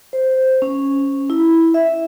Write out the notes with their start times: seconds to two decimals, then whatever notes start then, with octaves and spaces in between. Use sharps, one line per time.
0.13 C5
0.62 C#4
1.30 E4
1.74 E5